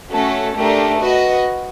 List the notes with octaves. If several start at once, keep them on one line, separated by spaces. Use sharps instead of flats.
A3 C#4 F#4 A4
A3 D4 G4 A#4
F#4 B4 D#5